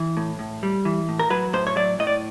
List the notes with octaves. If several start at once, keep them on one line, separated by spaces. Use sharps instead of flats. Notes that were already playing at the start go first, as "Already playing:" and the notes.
Already playing: E3
A2
A2
G3
E3
A2
A#4
F#3 B4
A2 C5
C#5
F#3 D5
A2 D#5
D5